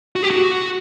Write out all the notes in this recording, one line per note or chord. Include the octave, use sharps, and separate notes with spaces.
F#4
G4
F#4